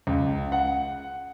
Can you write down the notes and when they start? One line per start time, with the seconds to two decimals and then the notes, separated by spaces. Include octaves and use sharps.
0.07 C#2
0.52 F#5